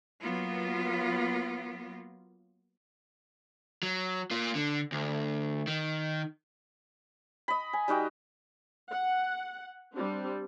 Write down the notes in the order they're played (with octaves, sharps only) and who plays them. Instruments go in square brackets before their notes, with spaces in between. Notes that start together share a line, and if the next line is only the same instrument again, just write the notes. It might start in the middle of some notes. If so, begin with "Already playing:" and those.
[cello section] F#3 A#3 B3 F4
[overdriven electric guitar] F#3
A#3 F4
D3
D2
D#3
[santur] D#5 B5
G#5
G3 D#4 F#4 G5
[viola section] F#5
G3 C4 D4